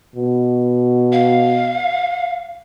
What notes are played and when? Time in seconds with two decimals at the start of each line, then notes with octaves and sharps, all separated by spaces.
0.16 B2
1.12 F5